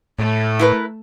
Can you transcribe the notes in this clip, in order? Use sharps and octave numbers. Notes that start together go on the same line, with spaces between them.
A2 A3
E4 A#4 B4